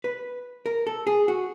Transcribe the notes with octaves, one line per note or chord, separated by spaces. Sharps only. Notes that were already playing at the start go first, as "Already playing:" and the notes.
B4
A#4
A4
G#4
F#4